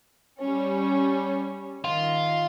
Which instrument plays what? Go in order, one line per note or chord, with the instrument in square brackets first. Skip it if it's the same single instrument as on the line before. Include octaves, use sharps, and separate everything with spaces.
[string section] G3 C#4
[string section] D#3 [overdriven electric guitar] F4